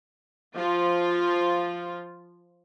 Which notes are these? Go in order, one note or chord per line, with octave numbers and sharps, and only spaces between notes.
F3 F4